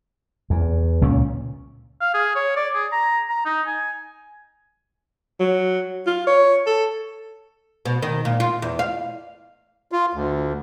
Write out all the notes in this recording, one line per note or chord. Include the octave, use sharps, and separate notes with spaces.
E2
C#2 A#2 C#4
F5
G#4
C#5
D5
G#4
A#5
A#5
D#4
G#5
F#3
F4
C#5
A4
B2
D#3
A#2
F4
E2
F5
F4
D2